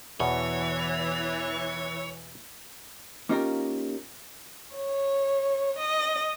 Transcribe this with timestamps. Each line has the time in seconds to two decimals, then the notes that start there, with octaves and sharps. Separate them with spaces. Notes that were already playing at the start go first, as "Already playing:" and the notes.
0.20 E2 B2 E3 C#5
3.29 A#3 C#4 D#4 F4 G4 A#4
4.75 C#5
5.77 D#5